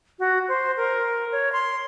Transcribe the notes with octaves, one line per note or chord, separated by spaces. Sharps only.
F#4
C5
A#4
C#5
C6